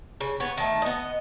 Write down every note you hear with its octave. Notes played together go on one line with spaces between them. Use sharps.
C#3
B3 C#5
D#3 A3
B3 D#5